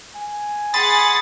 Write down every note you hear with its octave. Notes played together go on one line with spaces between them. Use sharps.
G#5
G#4 F#5 B5 C6 D#6 A6